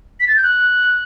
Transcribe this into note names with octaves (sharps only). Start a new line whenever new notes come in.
B6
A6
G6
F#6